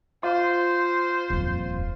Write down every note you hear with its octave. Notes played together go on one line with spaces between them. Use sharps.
F4 C5
D#1 F2